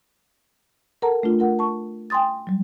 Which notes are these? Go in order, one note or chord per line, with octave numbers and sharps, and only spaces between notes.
A4 A#4 F#5 A5 A#5
A3 D4 F4
F4 A#4 F#5
A5 C#6
G5 G#5 C6 D#6 A6
F#3 G3